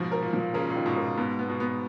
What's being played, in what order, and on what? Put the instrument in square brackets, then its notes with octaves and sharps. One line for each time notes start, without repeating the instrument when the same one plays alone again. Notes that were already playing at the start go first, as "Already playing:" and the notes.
Already playing: [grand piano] G#2 B2 [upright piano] F3
[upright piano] A#4
[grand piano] A#2
[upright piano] F3
[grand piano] A#2
[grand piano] A#2 C#3 [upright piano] A#4
[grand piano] A#2 C#3
[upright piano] D#3
[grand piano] G#2 B2
[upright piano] A#4
[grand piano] A#2
[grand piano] G#2 B2 [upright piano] B3
[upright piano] B3
[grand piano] G#2 B2
[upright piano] B3